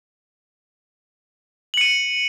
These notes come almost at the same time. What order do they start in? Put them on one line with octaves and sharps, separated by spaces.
F#7 C#7 D#7